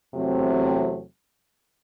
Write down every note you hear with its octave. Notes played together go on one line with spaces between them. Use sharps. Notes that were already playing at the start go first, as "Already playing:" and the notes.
E2 C3 F#3 A3 C4